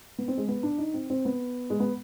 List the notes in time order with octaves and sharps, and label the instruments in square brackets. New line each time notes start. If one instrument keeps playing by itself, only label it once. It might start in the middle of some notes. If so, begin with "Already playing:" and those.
[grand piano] B3
C4
G#3
B3
D4
D#4
C4
C4
B3
G#3
B3